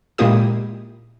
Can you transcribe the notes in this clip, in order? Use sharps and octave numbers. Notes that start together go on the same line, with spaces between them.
A#2 G#3 A#3 E4 G4 D#6